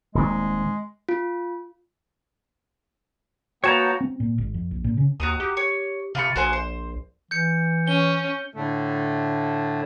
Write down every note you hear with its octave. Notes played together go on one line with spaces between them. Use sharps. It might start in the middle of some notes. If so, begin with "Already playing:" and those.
D#1 D#3 G#3 C4
F4
A#3 B3 F#4 C#5 G5 A5 A#5
C4
A#2
G#1
F2
A#1
A#2
C#3
D#2 F#4 A#5 D#6
G4
C#5
C3 F4 B5 C#6
A#1 F#4 C5 G#5
C5
E3 G6 C#7
C#4 G7
A2 D3 A3